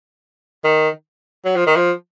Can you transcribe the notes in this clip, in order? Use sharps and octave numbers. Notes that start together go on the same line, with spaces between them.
D#3
F#3
F3
D#3
F3